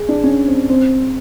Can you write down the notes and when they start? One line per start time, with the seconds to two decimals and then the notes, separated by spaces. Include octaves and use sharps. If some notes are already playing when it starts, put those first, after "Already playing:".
Already playing: G#4
0.09 D4
0.24 C#4
0.47 C4
0.69 C4